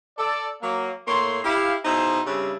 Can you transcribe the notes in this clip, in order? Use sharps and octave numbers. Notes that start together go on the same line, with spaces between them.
A4 D5
F#3 A#3
A2 A#3 C#5 C6
E4 G4 F5
B2 D#4 E4 G#4 C5
G2 C#3 G3 C4 D4 E4